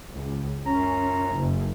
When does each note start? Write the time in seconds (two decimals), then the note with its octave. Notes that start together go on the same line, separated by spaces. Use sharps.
0.13 C#2
0.66 F#2 C#4 F4 A#5
1.31 F#1